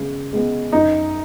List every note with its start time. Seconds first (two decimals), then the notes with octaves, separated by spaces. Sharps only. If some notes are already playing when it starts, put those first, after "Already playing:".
Already playing: C#3 G#3 B3
0.33 G#3 B3
0.72 F#2 D#4